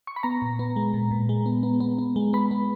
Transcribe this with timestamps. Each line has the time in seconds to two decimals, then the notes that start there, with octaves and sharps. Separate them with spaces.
0.07 C#6
0.16 B5
0.23 B3 A#5
0.42 A#2
0.59 B3
0.76 G#3
0.94 A#2
1.11 A#2
1.29 G#3
1.46 B3
1.63 B3
1.80 B3
1.98 B3
2.16 G#3
2.33 B3 B5
2.51 B3